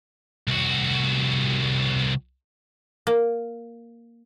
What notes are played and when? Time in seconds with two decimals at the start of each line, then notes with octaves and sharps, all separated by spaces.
0.48 C2 F#4
3.07 A#3